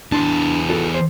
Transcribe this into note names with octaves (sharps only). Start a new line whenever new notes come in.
E2 D4 A5 C6
F4 F#4 A4
C5